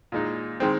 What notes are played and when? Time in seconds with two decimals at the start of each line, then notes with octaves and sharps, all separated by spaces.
0.12 A#2 G#3 D#4
0.60 D#3 G#3 C4